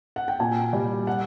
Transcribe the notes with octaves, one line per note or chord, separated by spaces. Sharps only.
F#5
G5
A#2 G#5
G3
F#5